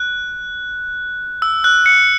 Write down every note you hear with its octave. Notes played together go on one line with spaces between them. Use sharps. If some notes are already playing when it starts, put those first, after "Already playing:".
Already playing: F#6
E6
F#6
C#7